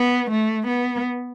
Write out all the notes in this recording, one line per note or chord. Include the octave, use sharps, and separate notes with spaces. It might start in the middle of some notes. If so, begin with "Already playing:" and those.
Already playing: B3
A3
B3